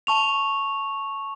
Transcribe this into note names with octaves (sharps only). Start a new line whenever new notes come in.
A5 C#6 F7